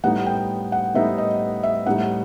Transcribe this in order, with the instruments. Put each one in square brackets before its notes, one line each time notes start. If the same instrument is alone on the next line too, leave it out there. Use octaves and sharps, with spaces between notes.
[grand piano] A2 G3 B3 D#4 [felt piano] F#5
[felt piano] G5
F#5
[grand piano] A2 G3 B3 D#4 [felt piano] E5
[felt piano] D#5
E5
[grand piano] A2 G3 B3 D#4 [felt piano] F#5